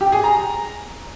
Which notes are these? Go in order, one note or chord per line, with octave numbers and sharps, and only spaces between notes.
G4
G#4
A#5